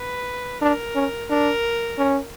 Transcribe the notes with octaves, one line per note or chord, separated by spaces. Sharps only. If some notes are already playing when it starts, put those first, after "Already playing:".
Already playing: B4
D4 A#4
C#4
D4 A#4
C#4